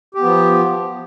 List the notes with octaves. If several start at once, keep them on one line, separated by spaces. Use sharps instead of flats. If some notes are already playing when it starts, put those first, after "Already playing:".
F3 B3 G4